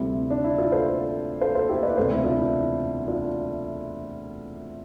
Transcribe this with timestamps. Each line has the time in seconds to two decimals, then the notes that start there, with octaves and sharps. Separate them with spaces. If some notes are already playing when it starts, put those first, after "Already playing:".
Already playing: D2 C3 G3 C4 E4
0.30 D4
0.44 E4
0.58 D4 F4
0.72 A4 C5
1.41 A4 C5
1.55 A4 C5
1.69 E4 G4
1.83 B4 D5
1.97 E1 D2 C3 A4 C5
2.11 E4
2.24 D4 F4
2.39 E4
3.08 D4 F4